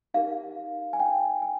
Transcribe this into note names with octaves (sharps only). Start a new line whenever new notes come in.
D#4 G4 A#4 F5
G#5
G5
G#5